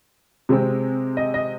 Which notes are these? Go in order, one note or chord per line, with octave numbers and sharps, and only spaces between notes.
C3 G#3 C4
D#5
D#5